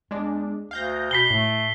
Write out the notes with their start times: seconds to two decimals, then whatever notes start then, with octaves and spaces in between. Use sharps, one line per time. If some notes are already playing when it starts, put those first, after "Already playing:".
0.11 E2 G#3 D4
0.71 D2 F5 G6 A#6
1.11 B2 B6 C7 G7
1.30 A2 A3